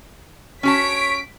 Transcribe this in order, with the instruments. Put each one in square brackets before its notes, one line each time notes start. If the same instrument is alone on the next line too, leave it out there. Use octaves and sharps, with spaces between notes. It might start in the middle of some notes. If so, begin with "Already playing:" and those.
[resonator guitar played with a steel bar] C#4 F#4 A5 [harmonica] C#5 [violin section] B6 D7